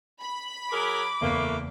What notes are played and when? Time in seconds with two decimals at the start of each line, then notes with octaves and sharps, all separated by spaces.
0.21 B5
0.72 F#3 G#4 A#4 D6
1.21 F#1 E2 E3 A3 A#3